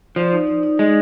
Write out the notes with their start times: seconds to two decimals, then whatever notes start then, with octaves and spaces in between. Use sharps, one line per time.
0.16 F3 D5
0.32 D#4
0.47 D#4
0.63 D#4
0.79 G#3 D#4